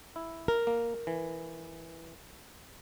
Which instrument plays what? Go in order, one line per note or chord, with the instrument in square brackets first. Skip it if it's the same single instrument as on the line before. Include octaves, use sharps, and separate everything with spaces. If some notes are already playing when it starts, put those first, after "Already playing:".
[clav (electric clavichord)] E4
[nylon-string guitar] A#4
[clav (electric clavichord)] A#3
E3